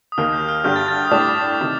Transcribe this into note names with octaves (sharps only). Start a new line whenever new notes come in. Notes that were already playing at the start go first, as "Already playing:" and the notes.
D#6
D#2 D#3 A#3 F6
G6
F6
G2 D3 G3 D4 G4 G6
A6
A6
D#6
A2 G3 D4 G4 D6
C3 D#3